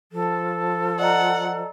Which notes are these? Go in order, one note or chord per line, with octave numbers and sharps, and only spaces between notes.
F3 A4
D5 D#5 F#5 A#5